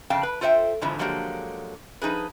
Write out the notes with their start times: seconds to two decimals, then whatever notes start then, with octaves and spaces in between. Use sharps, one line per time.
0.10 F2 C#3 F5 G5 A5
0.23 B4
0.41 F4 A4 C5 D5 E5 G5
0.81 F2 G#2 D3 E3 F3
0.99 D3 F3 F#3 G#3 A#3 G4
2.02 F3 D#4 G#4 B4